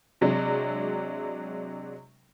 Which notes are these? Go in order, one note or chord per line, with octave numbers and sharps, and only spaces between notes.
C3 F#3 G#3 D4